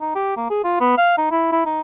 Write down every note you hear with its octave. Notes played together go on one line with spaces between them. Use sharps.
D#4
G4
A#3
G#4
F4
B3
F5
D#4
E4
E4
D#4